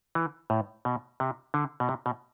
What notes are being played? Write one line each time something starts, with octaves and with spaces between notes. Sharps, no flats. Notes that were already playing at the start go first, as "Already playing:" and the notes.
E3
A2
B2
C3
D3
B2
C3
B2